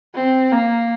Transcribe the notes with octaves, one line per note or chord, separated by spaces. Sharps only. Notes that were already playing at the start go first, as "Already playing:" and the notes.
C4
A#3